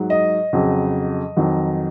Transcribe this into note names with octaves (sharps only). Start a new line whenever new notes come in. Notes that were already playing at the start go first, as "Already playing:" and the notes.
Already playing: G#2 F#3
D#5
F2 C#3 F#3
F2 D#3 F#3